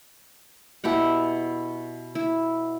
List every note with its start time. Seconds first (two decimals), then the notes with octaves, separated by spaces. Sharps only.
0.84 B2 E4 G4 F#5
2.15 E4